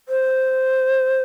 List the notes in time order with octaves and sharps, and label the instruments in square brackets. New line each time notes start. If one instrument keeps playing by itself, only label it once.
[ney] C5